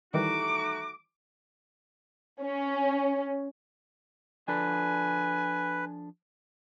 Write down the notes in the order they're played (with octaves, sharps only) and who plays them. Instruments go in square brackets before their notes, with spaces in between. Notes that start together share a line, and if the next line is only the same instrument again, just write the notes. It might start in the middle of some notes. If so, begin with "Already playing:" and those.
[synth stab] D#3 E3 G3 [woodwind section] A3 D#4 F#4 [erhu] D6
[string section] C#4
[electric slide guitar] F3 D4 A4 [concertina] B4 [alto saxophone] G#5